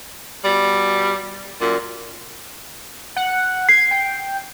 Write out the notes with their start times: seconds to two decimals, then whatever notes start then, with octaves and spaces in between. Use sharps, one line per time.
0.44 B2 G3
1.61 F#2 A#2
3.16 F#5
3.69 G#6 C7
3.91 G5